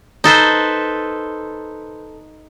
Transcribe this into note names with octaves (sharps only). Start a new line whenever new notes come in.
D#4 A4 B4 C5